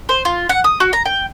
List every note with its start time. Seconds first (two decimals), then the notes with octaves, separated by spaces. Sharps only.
0.09 C5
0.25 F4
0.49 F#5
0.64 D#6
0.80 F#4
0.93 A#5
1.05 G5